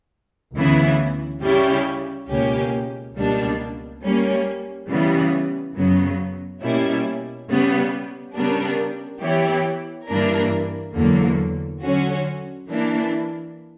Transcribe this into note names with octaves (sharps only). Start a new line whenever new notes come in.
D2 C#3 E3 B3 E4
C#3 G3 C#4 E4 G4
C#2 B2 A#3 C#4 G4
C#2 B2 G3 A#3 D4
G3 A#3 C#4
C#3 E3 G3 B3
F#2 C#3 F#3 B3
B2 G3 A#3 C#4 E4
C#3 G3 B3
C#3 G3 B3 D4 A#4
E3 B3 E4 G4 C#5
G2 E3 A#3 D4 A#4
E2 D3 F#3 A#3
D3 F#3 C#4 F#4
E3 A#3 D4